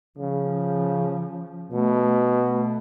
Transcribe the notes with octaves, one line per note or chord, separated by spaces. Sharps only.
C#3 F3
B2 A3
A3